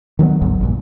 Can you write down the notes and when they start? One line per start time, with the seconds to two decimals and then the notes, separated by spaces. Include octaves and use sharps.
0.19 D#3 F#3 A#3 B3
0.41 G#1 D2 G#2 F#3
0.61 A#1 G2 A#2